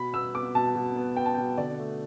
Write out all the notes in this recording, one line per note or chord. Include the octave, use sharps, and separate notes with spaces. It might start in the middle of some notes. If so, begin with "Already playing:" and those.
Already playing: B2 B5
B3 E6
B3 D6
B2 A5
B2
B3
B3 G5
A5
B2 G5
D3 D5
A3